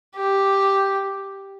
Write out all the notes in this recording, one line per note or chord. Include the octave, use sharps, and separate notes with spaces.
G4